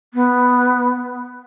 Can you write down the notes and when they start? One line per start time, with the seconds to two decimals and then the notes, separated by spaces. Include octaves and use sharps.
0.14 B3